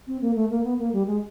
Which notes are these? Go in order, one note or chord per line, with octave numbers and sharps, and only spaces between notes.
C4
A#3
A3
A#3
B3
A#3
G3
G#3